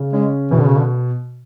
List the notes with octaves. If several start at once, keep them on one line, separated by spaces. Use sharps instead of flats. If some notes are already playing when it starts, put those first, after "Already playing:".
Already playing: C#3
G#3 C#4
B2 E3
D3
C#3
D3